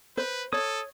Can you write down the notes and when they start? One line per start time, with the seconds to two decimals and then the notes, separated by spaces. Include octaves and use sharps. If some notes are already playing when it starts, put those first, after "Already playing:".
0.17 B4 C5
0.53 A4 C#5 D#6